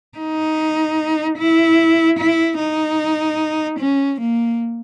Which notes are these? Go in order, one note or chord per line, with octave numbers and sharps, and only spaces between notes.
D#4
E4
E4
D#4
C#4
A#3